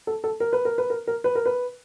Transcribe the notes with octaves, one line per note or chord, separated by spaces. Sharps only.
A4
A4
A#4
B4
A#4
B4
A#4
A#4
B4
A#4
B4